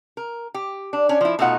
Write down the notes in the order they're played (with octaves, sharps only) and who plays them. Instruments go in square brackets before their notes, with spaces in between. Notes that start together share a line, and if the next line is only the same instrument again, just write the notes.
[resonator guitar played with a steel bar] A#4
G4
D4
C#4 D4
F3 E4
B2 A3 D#4 F4 F#5